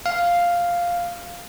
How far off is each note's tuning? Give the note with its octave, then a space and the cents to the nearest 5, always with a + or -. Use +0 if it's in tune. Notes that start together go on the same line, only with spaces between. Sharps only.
F5 +0